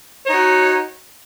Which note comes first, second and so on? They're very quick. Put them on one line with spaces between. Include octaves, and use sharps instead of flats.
C#5 D#4 F#4